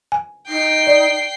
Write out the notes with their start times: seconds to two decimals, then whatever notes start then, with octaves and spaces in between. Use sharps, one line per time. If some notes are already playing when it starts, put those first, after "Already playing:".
0.12 G#5
0.48 D#4 G5 C7
0.87 D5